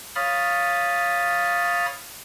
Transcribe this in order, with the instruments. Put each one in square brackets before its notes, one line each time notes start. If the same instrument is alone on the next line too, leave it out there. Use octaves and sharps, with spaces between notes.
[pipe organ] C#5 F5 B5 D#6 F6 A6